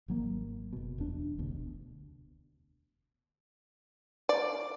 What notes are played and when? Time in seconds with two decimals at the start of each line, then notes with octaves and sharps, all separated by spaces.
0.08 G#1 F#3 A#3
0.73 F#1 B2
0.98 E1 D4
1.38 F1 D2 B2
4.29 D5